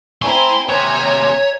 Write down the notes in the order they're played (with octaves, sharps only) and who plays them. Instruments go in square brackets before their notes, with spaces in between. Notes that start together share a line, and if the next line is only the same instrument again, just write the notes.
[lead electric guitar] A3 A#5 [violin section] C4 E4 G#5 [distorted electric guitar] C6
[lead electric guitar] D#2 C3 [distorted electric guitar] C#5 [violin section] E5 G#5 A#5